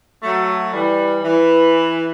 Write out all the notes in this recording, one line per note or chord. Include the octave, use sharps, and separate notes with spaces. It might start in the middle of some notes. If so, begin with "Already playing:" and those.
F#3 A3
E3 G3
E3